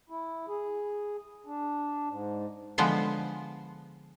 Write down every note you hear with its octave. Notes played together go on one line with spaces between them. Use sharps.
E4
G#4
D4
G#2
D3 F3 G#3 B3 C5